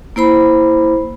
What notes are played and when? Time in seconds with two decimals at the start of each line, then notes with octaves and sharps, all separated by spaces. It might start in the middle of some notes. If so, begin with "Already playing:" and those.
0.16 A#3 E4 C5 B5